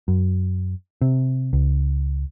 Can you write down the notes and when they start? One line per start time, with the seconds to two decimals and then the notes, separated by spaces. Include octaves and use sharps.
0.08 F#2
1.01 C3
1.53 C#2